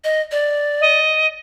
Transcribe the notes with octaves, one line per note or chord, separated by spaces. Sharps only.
D#5
D5
D#5